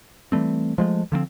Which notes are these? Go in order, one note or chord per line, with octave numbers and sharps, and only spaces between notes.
E3 G3 A3 C4
F3 G#3 A3
D3 F3 A#3 C4